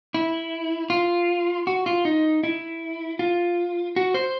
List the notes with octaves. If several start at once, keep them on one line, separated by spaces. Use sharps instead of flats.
E4
F4
F#4
F4
D#4
E4
F4
F#4
C5